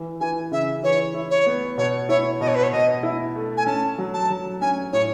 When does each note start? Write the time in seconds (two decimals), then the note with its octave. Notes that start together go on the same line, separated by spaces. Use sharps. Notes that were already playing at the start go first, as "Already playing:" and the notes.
Already playing: E3
0.20 E3 G#5
0.51 C#3 E5
0.83 E3 C#5
1.14 E4
1.30 C#5
1.47 B3
1.78 B2 C#5
2.09 E4 C#5
2.41 B2 D#5
2.48 C#5
2.55 B4
2.63 C#5
2.72 B2 D#5
3.03 E4
3.36 A3
3.57 G#5
3.66 C#4 A5
3.98 F#3
4.14 A5
4.30 F#3
4.61 C#4 G#5
4.93 A2 C#5